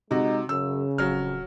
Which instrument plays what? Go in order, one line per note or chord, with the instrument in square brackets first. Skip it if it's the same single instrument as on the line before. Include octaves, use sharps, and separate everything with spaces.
[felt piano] C3 F#4 [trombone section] G#3 [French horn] D#4
[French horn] F#2 [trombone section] C#3 [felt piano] E6
[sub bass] D1 [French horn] F2 [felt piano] F#3 F6